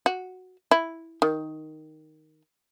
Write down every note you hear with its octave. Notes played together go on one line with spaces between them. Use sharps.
F#4
E4
D#3